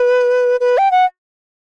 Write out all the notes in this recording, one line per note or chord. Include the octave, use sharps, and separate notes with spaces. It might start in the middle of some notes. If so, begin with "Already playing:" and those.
Already playing: B4
B4
G5
F#5